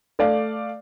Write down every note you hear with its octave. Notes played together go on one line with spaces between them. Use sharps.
A3 D5 F5